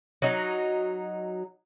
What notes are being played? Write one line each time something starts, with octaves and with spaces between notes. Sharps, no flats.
F#3 D#4